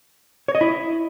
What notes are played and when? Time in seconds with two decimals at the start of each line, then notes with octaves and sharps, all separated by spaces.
0.48 C#5
0.55 D#5
0.61 E4